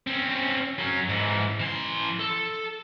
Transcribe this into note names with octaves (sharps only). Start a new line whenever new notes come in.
C4 C#4
F#3 C#4
G#2 E3
E3 C6
A4